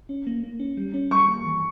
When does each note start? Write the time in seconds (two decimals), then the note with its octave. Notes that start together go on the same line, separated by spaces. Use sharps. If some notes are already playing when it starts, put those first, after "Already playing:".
0.09 C#4
0.27 A#3
0.43 A#3
0.60 C#4
0.77 G3
0.94 C#4
1.11 G3 C#6
1.28 A#3
1.45 E3